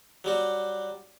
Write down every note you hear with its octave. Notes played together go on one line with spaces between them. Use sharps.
F#3 G3 F#4